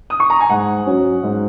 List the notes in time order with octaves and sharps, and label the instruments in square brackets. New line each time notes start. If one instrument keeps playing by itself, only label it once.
[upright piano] D#6
C#6
A#5
G#5
G#2 F#5
F#3 C#4
G#2